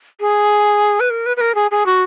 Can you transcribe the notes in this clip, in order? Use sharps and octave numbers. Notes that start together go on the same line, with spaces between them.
G#4
B4
A#4
B4
B4
A#4
G#4
G#4
F#4